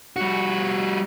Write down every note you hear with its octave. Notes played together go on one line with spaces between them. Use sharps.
G3 F#4